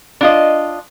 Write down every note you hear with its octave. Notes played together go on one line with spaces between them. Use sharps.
D4 F4 D#5